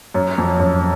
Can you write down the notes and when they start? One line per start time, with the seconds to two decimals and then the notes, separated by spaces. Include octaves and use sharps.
0.14 F#2
0.38 F2
0.60 F#2